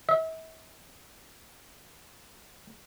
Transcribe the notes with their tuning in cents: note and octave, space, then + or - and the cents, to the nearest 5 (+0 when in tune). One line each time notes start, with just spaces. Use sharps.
E5 -40